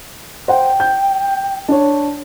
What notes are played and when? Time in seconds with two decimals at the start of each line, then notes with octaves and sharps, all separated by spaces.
0.48 C5 F#5 G5
0.80 G6
1.69 D4 C#5